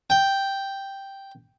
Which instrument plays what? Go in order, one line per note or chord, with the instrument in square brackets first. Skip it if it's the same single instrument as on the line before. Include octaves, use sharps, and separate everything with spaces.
[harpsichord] G5